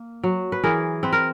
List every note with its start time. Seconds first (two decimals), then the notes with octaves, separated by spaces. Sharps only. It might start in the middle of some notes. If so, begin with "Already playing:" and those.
Already playing: A#3
0.24 F#3
0.52 B4
0.63 E3 G#4 A#4
1.03 C4 B4
1.13 A#4